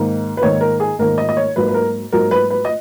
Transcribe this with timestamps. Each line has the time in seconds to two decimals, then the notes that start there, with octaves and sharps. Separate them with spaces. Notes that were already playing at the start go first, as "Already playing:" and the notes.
Already playing: G#2 D#3 A#3
0.37 B4
0.42 G#2 D#3 A#3 C#5
0.61 A#4
0.80 G#4
0.99 G#2 D#3 A#3 A#4
1.18 D#5
1.29 D#5
1.37 C#5
1.56 G#2 F#3 A#3 B4
1.68 B4
1.74 A#4
2.12 G#2 F#3 A#3 A#4
2.31 B4
2.50 B4
2.65 D#5